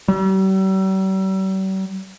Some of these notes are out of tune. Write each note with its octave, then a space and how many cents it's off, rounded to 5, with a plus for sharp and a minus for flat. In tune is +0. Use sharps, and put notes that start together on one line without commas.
G3 -45